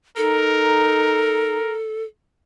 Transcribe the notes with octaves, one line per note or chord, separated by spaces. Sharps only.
D#4 A4 A#4